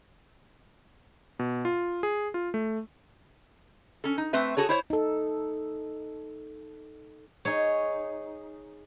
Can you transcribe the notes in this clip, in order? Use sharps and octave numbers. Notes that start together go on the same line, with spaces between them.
B2
F4
G#4
F4
A3
C#4 A4
D#4
A3 C4 B4 E5
F#4 G#4 A4 C#5
E4 C5 C#5
D#4 A4
D#4 G#4 C#5